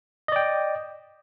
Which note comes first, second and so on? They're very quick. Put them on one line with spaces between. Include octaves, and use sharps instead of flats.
D#5 D5 G5